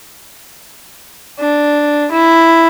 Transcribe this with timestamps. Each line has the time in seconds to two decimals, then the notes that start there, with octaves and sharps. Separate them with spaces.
1.40 D4
2.12 E4